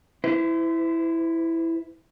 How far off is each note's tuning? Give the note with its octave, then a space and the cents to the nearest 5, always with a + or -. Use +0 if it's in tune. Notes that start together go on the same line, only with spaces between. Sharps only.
E4 +0 C5 -45